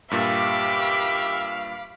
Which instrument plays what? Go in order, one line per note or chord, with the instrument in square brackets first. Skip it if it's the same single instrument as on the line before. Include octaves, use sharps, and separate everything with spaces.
[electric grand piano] G2 A#2 [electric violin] G4 E5 [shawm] F5 [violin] B5 D6